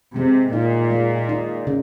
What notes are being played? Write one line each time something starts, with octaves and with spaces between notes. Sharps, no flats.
C3 G#3
A#2 D#4
G#3
D#4
C#3